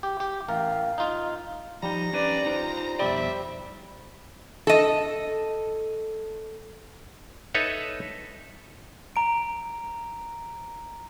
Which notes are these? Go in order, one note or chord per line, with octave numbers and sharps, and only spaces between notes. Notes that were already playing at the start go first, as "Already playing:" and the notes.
G4
G4
A1 A#4 F5
D#4 F4
F3 G3 D#4 A#5
C#4 D4 B4 D5
D#4 F4 C5
F2 B2 G3 D5 E5
A4 D#5
D#4 A4 B4 C#5 E5
A#5 D7